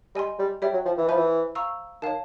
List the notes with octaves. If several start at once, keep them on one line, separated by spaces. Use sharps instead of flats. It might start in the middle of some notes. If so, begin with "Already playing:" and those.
G3 D#5 G#5 C6
G3
G3 C#5 E5 G5
F#3
F3
E3
F3 C5 E5 G#5 B5
E3
F5 A#5 C#6 E6
D#3 C#5 F5 A5